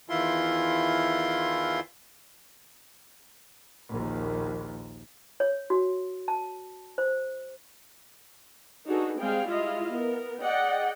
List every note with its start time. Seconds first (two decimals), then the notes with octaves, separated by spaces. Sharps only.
0.09 E2 D#3 E3 E4 F4 C6
3.89 A#1 D#2
5.40 C#5
5.70 F#4
6.28 A5
6.98 C5
8.86 D4 D#4 F#4 G#4 A4 B4
9.19 G3 G#3 C4 G#4 F5 G5
9.49 G#3 E4 F4 D#5 F5
9.91 B3 A#4
10.41 G#4 D5 D#5 F#5 G5